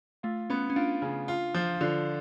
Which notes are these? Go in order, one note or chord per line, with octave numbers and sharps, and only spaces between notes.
A3 F4
B3 C#4
C#4
D4 F4
C#3
F4
F3
D3 F4